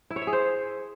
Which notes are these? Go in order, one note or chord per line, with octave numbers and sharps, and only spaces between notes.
E4
C#5
E5
G#4
C5